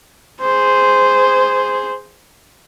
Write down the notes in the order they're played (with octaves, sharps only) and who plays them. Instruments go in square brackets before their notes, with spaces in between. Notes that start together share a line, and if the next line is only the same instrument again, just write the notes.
[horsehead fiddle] G#4 C5